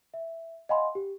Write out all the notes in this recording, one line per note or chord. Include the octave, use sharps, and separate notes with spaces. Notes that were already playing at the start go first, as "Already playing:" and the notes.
E5
D#5 F5 F#5 G#5 B5 C6
G4